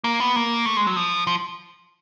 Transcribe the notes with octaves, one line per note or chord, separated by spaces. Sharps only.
A#3
B3
A#3
A3
G#3
F#3
F3
F3